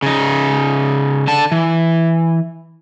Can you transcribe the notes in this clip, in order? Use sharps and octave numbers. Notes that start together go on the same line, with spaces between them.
C#3 D#4
D3 A5
E3